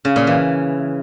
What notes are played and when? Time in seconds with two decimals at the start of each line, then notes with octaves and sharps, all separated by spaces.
0.05 C#3
0.16 A#2
0.27 E3